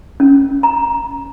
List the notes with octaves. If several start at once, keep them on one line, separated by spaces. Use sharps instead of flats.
C#4
A#5